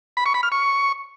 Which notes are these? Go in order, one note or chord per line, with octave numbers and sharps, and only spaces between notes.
B5
C#6
B5
F6
C#6